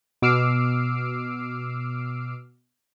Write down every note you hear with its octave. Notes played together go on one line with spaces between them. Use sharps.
B2 D6 E6 F6 C7 D7